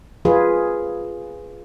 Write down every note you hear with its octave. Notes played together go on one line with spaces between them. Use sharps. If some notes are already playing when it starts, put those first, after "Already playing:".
F3 F4 G#4 B4